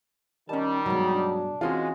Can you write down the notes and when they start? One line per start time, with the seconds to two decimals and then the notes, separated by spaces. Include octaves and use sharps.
0.49 D#3 G3 C#4 D#4 A5
0.86 G2 B2 F#3 G#3
1.14 D4
1.61 E3 G#3 C4 C#4 F4 F#4 G#4